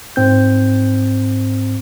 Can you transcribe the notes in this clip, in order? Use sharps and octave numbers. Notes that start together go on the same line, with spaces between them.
G#2 C4 G6